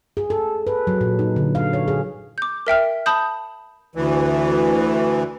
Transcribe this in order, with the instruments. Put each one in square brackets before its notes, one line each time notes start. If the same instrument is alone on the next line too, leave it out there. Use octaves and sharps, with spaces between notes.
[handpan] G#4
A4
B4
F#3
A#2
D#4
D3
F5
C#5
G#4
[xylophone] D6 G6
A#4 E5 G5 F6
A5 B5 D#6 G6
[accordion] D2 E3